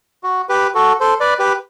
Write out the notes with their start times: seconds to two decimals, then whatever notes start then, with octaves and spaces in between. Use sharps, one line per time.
0.24 F#4
0.49 G4 B4
0.75 F#4 A4
1.01 A4 C5
1.20 B4 D5
1.39 G4 B4